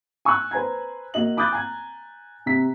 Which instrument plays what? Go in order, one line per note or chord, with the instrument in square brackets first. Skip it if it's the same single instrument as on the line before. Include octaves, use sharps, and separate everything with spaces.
[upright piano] G#5 C#6 E6 F#6
B4 C5 G#5 A#5 G#6
A#3 F#4 D#5 F#7
B5 D6 D#6 F#6 G6 A6
G#5 A#5 G#6
C3 A#5 B6